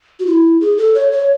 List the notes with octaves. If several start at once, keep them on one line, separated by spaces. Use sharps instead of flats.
F#4
E4
G#4
A4
C#5
C#5